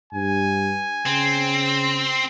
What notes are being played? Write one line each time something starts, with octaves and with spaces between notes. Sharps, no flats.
G2 G#5
C#3 C4